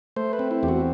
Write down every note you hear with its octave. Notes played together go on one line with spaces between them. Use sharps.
A3 C5
B4
C4
E4
E2 G4
F#4